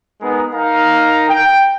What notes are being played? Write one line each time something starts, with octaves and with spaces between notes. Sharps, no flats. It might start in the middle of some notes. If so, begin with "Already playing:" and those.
G#3 B3 D#4 G#4 A#4
D#4 A#4 F5 A#5
G5